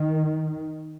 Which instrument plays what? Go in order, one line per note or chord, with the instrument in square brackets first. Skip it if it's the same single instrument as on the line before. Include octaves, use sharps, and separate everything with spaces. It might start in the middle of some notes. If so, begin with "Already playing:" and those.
Already playing: [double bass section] D#3